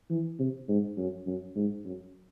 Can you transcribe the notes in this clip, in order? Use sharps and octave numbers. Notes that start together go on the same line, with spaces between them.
E3
C3
G#2
F#2
F#2
G#2
F#2